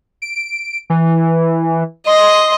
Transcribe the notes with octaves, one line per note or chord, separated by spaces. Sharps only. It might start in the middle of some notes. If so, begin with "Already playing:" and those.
D7
E3
D#5 C6